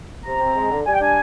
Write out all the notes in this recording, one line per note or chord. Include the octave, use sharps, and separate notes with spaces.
C3 A#5
C4
G#3
D3
G3 G#5
G5
D4 G#5